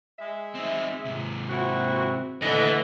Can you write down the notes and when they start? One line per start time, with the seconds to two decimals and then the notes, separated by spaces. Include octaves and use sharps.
0.19 G#3 E5
0.55 C4 D#4
1.06 G#2 C3
1.50 A#2 C4 E4 F#4
2.42 D3 E3 A3 D#5 F#5